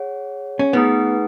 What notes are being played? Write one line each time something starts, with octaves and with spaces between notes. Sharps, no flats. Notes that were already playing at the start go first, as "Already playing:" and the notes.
Already playing: G#4 C#5 F#5
C#4
A3 B3 D#4 G#4 B4 F#5